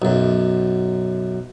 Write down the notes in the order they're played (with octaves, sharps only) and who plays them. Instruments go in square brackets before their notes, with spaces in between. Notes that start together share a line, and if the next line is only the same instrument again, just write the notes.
[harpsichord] B1 F#2